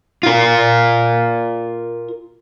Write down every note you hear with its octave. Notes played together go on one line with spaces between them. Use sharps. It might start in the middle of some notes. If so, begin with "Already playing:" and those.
F4 A#4